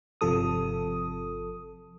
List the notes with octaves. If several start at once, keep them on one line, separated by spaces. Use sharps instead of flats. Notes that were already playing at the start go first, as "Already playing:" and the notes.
G1 C3 F3 A4 D#6